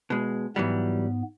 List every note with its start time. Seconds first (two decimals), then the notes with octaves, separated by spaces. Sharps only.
0.10 B2 G#3
0.56 G#2 E3 F#3 G3 B3